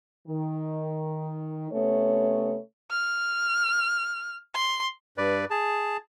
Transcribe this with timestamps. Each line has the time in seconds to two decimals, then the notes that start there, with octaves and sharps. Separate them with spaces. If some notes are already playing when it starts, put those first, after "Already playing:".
0.27 D#3
1.71 C3 A3 B3 C#4 C#5
2.91 F6
4.55 C6
5.18 G2 B4 D5
5.50 G#4 A5